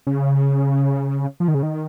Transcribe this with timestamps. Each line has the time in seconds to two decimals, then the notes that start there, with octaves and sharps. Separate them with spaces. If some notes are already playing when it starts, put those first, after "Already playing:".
0.07 C#3
1.40 F3
1.48 D#3
1.54 C#3
1.63 D#3